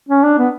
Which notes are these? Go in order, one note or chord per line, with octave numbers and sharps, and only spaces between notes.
C#4
D4
B3